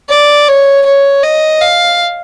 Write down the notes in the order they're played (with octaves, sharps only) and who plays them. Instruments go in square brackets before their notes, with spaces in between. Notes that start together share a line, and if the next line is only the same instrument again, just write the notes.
[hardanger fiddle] D5
C#5
C#5
D#5
F5